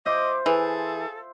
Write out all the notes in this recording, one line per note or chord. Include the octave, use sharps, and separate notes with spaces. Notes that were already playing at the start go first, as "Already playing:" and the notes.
F4 C5 D#5 E5 D6
E3 G#4 A4